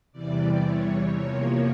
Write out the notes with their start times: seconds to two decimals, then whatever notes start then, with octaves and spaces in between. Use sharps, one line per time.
0.12 E2 C3 E3 G3 D5
0.64 C#5
1.14 E2 C3 F3 A#3 C#5